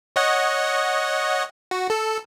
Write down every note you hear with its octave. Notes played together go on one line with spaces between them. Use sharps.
C#5 D#5 F#5
F#4
A4